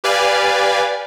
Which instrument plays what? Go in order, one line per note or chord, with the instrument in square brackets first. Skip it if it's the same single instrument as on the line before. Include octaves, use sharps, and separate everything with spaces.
[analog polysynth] G4 B4 D5 F5 G#5